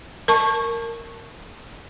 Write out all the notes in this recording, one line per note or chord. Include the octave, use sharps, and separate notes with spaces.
A#4 A5 C#6